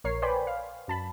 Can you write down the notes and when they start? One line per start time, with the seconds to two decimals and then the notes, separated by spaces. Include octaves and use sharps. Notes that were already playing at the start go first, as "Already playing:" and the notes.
0.04 A#1 A#4 C#5 C7
0.22 B4 C5 D5 G5 G#5 B5
0.47 F5
0.88 F#2 A5 B5